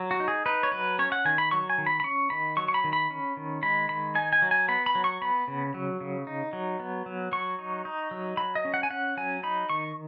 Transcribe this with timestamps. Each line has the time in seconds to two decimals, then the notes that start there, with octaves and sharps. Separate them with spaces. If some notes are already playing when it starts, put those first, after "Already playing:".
Already playing: F#3
0.11 F#4
0.20 D#4
0.28 G#4
0.46 D#4 B4
0.63 C#5
0.72 F#3 B4
0.99 C#4 C#5
1.12 F#5
1.25 D#3 G#5
1.38 B5
1.51 F#3 C#6
1.70 G#5
1.78 D#3
1.86 B5
2.00 B5
2.04 C#4 C#6
2.30 D#3 B5
2.57 F#3 C#6
2.68 C#6
2.74 B5
2.84 D#3
2.93 B5
3.10 C#4
3.37 D#3
3.63 G#3 B5
3.89 D#3 B5
4.15 D#4 G#5
4.33 G#5
4.42 F#3
4.51 G#5
4.68 B3 B5
4.86 B5
4.95 F#3
5.04 C#6
5.22 B3 B5
5.48 C#3
5.74 F#3
6.01 C#3
6.27 D#4
6.53 F#3
6.80 B3
7.06 F#3
7.32 F#3 C#6
7.59 D#4
7.85 D#4
8.11 F#3
8.37 F#3 B5
8.55 D#5
8.65 C#4
8.74 F#5
8.83 G#5
8.90 C#4 F#5
9.17 F#3 G#5
9.43 D#4 B5
9.70 D#3 C#6